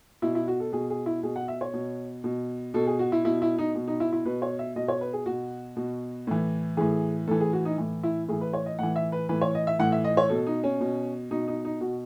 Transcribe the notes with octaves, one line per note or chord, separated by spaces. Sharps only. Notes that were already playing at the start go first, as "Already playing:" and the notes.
B2 E4
E4
F#4
A4
B2 G#4
G#4
E4
B2 G#4
F#5
E5
C#5
B2
B2
B2 A4
G#4
F#4
E4
B2 E4
E4
D#4
B2
D#4
E4
E4
B2 B4
C#5
E5
B2 D#5
C#5
B4
G#4
B2 F#4
B2
A2 E3
A2 E3 G#4
A2 E3 A4
G#4
F#4
D#4
A2 E3
E4
A2 E3 G#4
B4
C#5
D#5
A2 E3 F#5
E5
B4
A2 E3 B4
C#5
D#5
E5
A2 E3 F#5
E5
D#5
C#5
B2 A4
D#4
C#4
B2
B2 D#4
D#4
D#4
B2 F#4